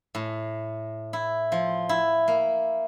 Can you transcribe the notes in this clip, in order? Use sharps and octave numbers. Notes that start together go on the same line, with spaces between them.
A2
E4
F3
E4
A#3